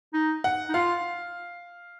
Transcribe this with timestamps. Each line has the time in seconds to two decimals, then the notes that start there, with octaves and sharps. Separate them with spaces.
0.14 D#4
0.44 F#5
0.69 D#4
0.74 F4 F5